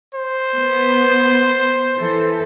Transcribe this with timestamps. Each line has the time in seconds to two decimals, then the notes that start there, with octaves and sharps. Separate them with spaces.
0.15 C5
0.56 B3
1.97 E3 A4